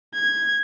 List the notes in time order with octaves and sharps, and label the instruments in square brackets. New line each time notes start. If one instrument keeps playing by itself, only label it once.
[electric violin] G#6